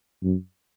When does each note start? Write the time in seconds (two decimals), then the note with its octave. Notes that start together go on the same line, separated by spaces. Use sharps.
0.23 F#2